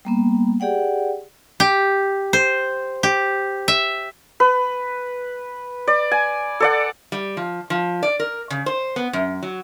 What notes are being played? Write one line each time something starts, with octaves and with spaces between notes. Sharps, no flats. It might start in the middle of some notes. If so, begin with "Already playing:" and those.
G3 A#3 B3
G4 G#4 D5 F#5 G5
G4
C5
G4
E5
B4
D5
G#5
A4 D5 F#5
G3
F3
F3
D5
A#4
C#3
C5
B3
F#2
F#3